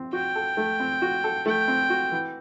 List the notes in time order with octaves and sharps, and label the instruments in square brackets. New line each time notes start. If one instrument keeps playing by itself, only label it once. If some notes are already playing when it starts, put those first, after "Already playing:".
Already playing: [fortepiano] C4
[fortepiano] F#4 [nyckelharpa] G5
[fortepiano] A4
A3
C4
F#4
A4
[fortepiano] A3 [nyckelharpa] G5
[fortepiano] C4
F#4
E3